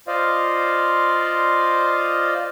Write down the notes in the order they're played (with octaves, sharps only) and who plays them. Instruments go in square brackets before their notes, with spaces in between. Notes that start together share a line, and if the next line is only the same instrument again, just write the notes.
[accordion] F4 C5 D5 D#5 F5